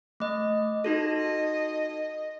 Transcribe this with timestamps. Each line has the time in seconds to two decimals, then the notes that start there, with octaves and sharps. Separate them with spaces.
0.20 A3 D#5
0.84 D#4 F#4 A4 D#5